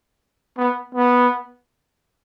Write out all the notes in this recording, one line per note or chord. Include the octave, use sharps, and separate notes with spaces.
B3
B3